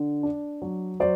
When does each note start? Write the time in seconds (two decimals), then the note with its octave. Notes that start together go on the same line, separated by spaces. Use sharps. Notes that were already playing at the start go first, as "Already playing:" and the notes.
Already playing: D3
0.23 D4
0.62 F#3
1.00 F#3 C5 D5